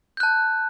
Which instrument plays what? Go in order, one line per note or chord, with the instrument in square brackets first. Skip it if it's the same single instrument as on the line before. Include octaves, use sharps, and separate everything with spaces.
[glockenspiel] G6
F#6
A5